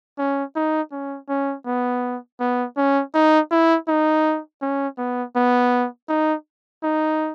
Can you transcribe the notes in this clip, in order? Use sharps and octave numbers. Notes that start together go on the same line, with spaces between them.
C#4
D#4
C#4
C#4
B3
B3
C#4
D#4
E4
D#4
C#4
B3
B3
D#4
D#4